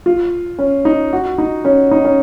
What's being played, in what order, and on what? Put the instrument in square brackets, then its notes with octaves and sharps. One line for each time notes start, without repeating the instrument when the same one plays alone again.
[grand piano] F4
C#4
D#4
F#4
D#4
C#4
D#4
C#4